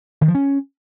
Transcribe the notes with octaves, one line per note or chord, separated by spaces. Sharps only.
D#3
F3
C#4